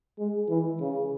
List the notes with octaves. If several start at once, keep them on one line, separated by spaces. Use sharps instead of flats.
G#3
E3
C#3